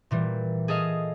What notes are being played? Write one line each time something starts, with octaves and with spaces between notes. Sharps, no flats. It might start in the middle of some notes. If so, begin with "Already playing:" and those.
A#2 E3 G3
G#4 A4 D#5 F5